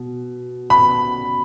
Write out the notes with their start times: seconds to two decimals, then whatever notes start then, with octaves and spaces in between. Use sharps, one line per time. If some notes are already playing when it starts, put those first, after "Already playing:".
Already playing: B2
0.70 B5